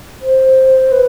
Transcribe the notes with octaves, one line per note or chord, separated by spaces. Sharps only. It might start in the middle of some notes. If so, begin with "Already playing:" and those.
C5
B4